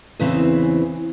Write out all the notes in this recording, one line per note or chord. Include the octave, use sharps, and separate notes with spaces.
E2 C#3 E3 C4